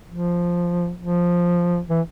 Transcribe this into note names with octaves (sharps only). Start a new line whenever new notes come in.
F3
F3
E3